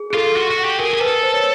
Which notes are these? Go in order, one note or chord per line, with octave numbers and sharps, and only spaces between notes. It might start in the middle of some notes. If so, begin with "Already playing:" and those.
Already playing: G#4
G#4
F4 A4
F#4
F#4
G4
G#4 A#4
G#4 A#4
A4 B4
C5
C#5